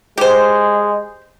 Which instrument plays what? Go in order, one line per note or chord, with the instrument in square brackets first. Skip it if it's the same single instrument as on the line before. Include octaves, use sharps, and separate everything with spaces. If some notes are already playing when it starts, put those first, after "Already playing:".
[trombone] G#3 [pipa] G4 C5